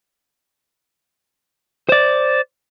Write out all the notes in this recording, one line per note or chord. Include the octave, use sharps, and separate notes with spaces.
C5 D5